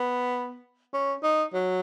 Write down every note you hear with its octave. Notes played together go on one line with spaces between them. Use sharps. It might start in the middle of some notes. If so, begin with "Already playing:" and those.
Already playing: B3
C#4
D#4
F#3